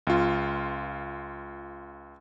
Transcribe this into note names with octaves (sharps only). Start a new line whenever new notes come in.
C#2 F4